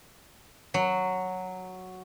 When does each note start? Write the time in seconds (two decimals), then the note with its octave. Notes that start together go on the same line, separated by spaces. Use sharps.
0.74 F#3